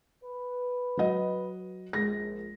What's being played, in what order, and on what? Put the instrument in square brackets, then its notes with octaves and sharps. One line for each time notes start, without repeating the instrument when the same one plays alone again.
[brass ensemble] B4
[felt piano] F#3 D#5
[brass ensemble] A#1 [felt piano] G#3 A#6